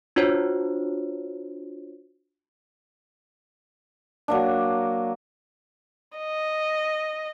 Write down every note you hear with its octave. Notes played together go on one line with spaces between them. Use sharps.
D4 F4 F#4 C5 C#5
F#3 A#3 D4
D#5